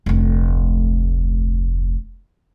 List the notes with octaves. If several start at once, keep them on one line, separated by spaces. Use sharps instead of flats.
F1 D2